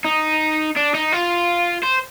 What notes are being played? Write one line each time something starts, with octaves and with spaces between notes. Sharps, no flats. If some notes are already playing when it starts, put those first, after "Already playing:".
D#4
D4
D#4
F4
C5